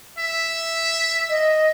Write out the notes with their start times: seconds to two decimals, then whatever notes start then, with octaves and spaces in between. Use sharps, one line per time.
0.18 E5
1.30 D#5